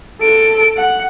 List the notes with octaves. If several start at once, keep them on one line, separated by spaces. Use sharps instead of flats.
A4 D7
F#5